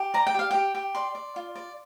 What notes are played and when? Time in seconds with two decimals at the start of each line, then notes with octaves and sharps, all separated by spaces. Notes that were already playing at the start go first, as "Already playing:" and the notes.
Already playing: G4
0.14 D5 A#5
0.27 G5
0.34 G4 F5
0.51 G4 G5
0.75 G4
0.95 D5 C6
1.15 D5
1.36 F4
1.56 D5